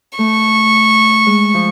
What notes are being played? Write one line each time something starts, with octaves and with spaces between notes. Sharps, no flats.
A3 C#6
G#3
F3